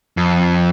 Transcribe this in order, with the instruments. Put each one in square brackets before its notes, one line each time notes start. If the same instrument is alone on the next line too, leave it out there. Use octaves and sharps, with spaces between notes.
[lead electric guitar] F2